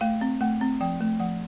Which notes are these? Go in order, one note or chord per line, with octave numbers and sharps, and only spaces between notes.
A3 F5
C4
A3 F#5
C4
F3 G5
A3
F3 F#5